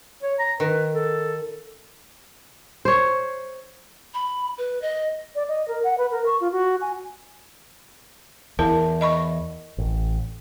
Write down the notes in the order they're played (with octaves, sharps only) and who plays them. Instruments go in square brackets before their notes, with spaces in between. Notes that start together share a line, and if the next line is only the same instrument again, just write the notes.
[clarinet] C#5
A#5
[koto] D#3 [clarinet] B4
[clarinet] A4
[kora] C5 C#5
[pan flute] B5
B4
D#5
[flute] D5
D#5
A#4
F#5
B4
A#4
C#6
F4
F#4
G#5
[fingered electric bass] E2 [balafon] E4 A#4 A5
[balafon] D#5 B5 C#6
[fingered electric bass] A1